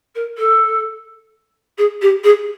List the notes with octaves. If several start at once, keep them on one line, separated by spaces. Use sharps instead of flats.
A#4
A4
G#4
G4
G#4